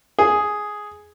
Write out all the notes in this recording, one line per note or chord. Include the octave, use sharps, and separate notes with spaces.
G#4